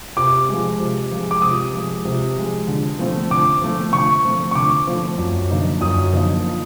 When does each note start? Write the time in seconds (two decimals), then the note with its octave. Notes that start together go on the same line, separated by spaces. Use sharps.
0.17 C3 D6
0.49 F3 G#3
0.80 C3
1.11 F3 G#3
1.31 D6
1.42 C3 D#6
1.74 F3 G#3
2.05 C3
2.37 F3 G#3
2.68 D3
2.99 F3 A3 C4
3.31 D3 D6
3.62 F3 A3 C4
3.93 D3 C#6
4.25 F3 A3 C4
4.51 C#6
4.55 D3 D6
4.87 F3 A3 C4
5.18 F#2
5.51 D3 F3 A#3 D#4
5.81 F#2 D#6
6.13 D3 F3 A#3 D#4